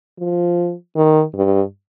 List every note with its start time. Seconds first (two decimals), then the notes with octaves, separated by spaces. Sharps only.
0.19 F3
0.96 D#3
1.35 G2